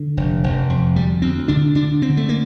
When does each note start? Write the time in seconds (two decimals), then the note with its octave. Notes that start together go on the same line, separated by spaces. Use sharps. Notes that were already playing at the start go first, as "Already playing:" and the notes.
Already playing: D3
0.17 F1
0.44 F1
0.70 F2
0.96 D2 G3
1.22 D2 C4
1.48 D3 D4
1.75 D3 D4
2.02 D3 C4
2.17 A3
2.29 A#3